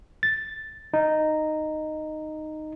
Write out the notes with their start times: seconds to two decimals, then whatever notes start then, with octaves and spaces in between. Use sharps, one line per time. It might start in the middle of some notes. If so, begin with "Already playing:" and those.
0.23 A6
0.94 D#4